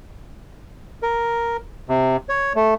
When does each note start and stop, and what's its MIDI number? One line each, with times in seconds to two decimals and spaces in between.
1.03 1.57 70
1.89 2.17 48
2.29 2.53 73
2.55 2.74 57